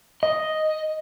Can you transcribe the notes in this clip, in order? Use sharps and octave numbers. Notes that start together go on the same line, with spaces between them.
D#5